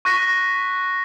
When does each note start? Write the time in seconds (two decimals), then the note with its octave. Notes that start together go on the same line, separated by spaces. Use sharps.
0.05 C#6 F#6 A#6 B6